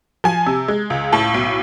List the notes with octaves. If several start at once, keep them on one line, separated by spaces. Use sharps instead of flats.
F3 G#5
C3
G#3
C#2
A2 A5
B1